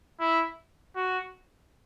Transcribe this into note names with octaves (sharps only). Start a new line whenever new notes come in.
E4
F#4